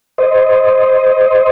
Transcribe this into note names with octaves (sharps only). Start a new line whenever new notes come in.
C5 D#5